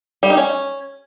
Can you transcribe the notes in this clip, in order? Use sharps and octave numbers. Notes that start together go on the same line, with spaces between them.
G3
D#4
C#4